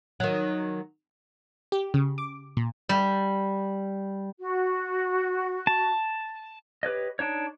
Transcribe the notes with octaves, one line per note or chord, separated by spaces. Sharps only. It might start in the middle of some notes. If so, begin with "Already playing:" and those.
D#3 F#3
G4
C#3
D6
A#2
G3
F#4
A5
G4 B4 C#5 D#5
D4 D#4 C#5